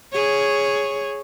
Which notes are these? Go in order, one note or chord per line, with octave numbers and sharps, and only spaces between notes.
G#4 C#5